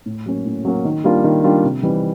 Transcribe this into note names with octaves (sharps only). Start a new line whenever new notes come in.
A2
F#3 A#3 C#4 F#4
A2
F#3 A#3 C#4 F#4
D#3
G3 A#3 D4 F4
D#3
G3 A#3 D4 F4
C3
E3 G3 C4 D#4